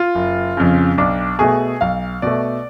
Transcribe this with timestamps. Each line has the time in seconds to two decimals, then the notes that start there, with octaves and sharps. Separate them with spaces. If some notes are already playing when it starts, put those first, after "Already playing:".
Already playing: F4
0.15 F#1
0.57 F2 C#3
0.98 B1 D4
1.39 B2 A3 G#4
1.81 B1 F5
2.22 B2 A3 D5